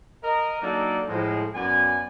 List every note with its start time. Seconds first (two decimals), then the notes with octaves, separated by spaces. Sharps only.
0.22 A#4 D#5
0.62 F#3 A#3 D4 D#4 A4 D5
1.08 A2 F3 G#3
1.55 F#2 B3 D5 G#5